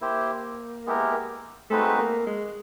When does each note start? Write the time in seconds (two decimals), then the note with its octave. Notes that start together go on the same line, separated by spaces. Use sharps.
0.01 A#3 E4 G4 C5
0.86 G#3 B3 E4 G4 A#4
1.70 G#3 A3 C4 D#4 F#4 B4
1.99 A#3
2.27 G#3